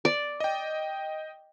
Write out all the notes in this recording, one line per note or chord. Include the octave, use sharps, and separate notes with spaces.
D5
D#5 G5